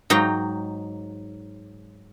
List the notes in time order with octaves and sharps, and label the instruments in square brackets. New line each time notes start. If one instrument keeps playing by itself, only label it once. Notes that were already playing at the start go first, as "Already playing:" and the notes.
[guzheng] G#2 F#3 D#4 G5